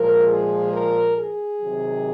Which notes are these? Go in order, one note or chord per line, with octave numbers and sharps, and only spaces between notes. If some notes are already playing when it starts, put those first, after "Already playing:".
Already playing: A#2 F3 G#3 A#4
G#4
A#4
G#4
C3 D#3 F#3